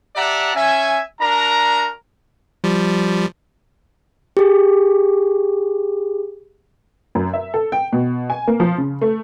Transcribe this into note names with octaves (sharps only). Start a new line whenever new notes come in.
G4 D5 E5 F#5 A5 A#5
C#4 E5 G#5
D4 F#4 A#4 A#5
F3 G3
G4 G#4
F#2
E5
A4
G5
B2
G#5
A#3
F3
C#3
A3